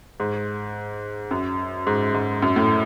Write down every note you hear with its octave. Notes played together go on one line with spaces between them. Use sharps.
G#2
F#2
G#2
G#2
F#2
A2